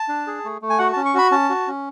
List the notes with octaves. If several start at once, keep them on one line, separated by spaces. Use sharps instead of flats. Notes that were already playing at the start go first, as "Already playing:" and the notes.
Already playing: A5
D4
G#4
A3
A3
G#5
F#4 F#5
C#4 A5
C#6
F#4 B5
C#4 A5
F#4
C#4